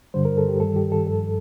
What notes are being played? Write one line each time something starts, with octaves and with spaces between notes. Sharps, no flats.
G2 D3 G3 C5
A#4
A4
G4
G2 D#3 G3 A4
G4
A4
G2 F3 A4